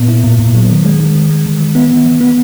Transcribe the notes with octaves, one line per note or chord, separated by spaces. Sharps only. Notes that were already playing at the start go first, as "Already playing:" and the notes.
Already playing: A#2 B3
E4
A#2
A#2
F#3
D#3
G#3
D#3
D#3
G#3
D#3
E3
B3
E3
E3
B3